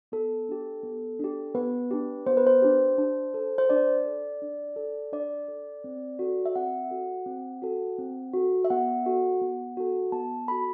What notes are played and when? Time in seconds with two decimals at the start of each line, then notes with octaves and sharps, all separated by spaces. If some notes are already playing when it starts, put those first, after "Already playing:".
0.12 B3 A4
0.49 D4 G4
0.83 B3
1.20 D4 G4
1.55 B3 B4
1.91 D4 G4
2.27 B3 C5
2.37 B4
2.47 C5
2.62 D4 G4
2.98 D4
3.34 A4
3.58 C5
3.70 D4 D5
4.05 A4
4.42 D4
4.76 A4
5.12 D4 D5
5.48 A4
5.84 C4
6.19 F#4 A4
6.46 E5
6.55 C4 F#5
6.91 F#4 A4
7.26 C4
7.62 F#4 A4
7.98 C4
8.33 F#4 A4
8.65 E5
8.70 B3 F#5
9.06 F#4 A4
9.42 B3
9.77 F#4 A4
10.12 B3 A5
10.48 F#4 A4 B5